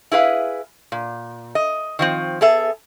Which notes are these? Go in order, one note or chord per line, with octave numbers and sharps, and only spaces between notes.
E4 G#4 B4 F5
A#2
D#5
D#3 F3 C4
B3 G#4 A4 E5